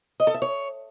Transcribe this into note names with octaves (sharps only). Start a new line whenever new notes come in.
D#5
A4
E5
C#5